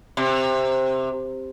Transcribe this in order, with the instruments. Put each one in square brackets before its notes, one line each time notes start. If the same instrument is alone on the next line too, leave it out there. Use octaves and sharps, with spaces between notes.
[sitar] C3